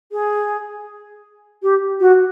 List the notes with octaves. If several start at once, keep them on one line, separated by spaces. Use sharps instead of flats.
G#4
G4
F#4